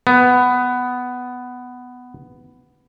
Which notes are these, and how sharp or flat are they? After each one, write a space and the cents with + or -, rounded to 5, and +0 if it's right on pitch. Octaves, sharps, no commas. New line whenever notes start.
B3 +10